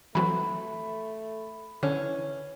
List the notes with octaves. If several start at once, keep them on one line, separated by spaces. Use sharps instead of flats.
E3 F#3 A3 C4 B5
D3 E3 C#4